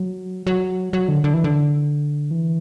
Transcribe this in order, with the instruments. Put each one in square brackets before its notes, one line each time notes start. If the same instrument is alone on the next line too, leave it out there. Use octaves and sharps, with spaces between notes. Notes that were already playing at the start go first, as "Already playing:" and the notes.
Already playing: [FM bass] F#3
F#3
F#3
D3
D3
E3
D3
E3